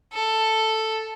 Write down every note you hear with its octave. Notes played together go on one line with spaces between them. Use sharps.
A4